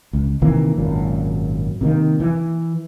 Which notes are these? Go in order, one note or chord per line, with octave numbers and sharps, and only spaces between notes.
C#2
C3 D#3 E3 A#3
G#1 F#2 A#2
C3 D#3 A#3
E3